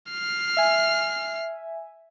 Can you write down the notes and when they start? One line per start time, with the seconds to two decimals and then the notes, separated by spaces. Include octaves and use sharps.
0.11 F6 C7
0.57 E5 G#5